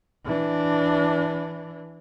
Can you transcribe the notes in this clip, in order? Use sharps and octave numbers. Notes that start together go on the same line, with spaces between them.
E3 D4